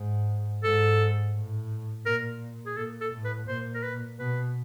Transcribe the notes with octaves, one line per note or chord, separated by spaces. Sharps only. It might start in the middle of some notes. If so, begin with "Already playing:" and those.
Already playing: G#2
G#2 A4
A2
A#2 A#4
G#4
A#2 A4
A4
A2
B4
A#2 C5
A#4
B4
B2 B4